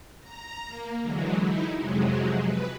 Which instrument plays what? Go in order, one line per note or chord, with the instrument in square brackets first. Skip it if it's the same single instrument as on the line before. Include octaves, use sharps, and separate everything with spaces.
[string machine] A#5
A#3
D3 E3 F#3 G#3
D#4 E4
F2 C3 F#3 G#3
B4